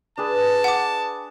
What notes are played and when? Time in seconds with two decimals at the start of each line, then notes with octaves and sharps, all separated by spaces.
0.18 D4 G#4 B4 A5
0.64 F#5 D6